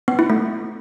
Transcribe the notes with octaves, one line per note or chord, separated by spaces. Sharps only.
B3
E4
A3